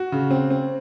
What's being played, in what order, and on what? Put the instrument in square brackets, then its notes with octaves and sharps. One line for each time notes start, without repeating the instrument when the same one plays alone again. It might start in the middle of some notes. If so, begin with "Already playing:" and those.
Already playing: [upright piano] F#4
C#3
C4
C4